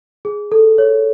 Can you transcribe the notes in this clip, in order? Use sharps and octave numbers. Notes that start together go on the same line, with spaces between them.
G#4
A4
C#5